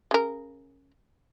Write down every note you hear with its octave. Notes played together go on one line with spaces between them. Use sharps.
C#3 A#4